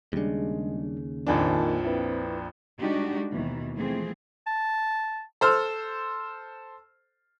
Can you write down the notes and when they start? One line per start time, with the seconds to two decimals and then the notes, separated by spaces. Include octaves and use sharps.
0.13 D#2 C#3 G3 G#3 D4
1.27 A#1 F2 D#3 A#3 D4 G#5 A5
1.85 C4 E4 B4
2.79 G3 G#3 D4 D#4 F#4 G4
3.31 D#2 B2 D#3 E3
3.75 E3 F3 G#3 A3 C4 G#4
4.47 A5
5.41 A4 C5 E6 F6